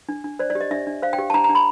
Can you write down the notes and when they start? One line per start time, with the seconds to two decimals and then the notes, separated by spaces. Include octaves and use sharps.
0.09 D4
0.24 D4
0.39 C5 D5
0.50 D5
0.55 G4
0.61 D#5
0.71 D4 E5
0.87 D4
1.03 C5 F5
1.13 G5
1.18 G4
1.30 A5
1.34 D4 A#5
1.44 A#5
1.49 D4
1.55 B5